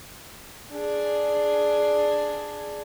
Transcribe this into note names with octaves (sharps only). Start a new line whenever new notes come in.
D4 G#4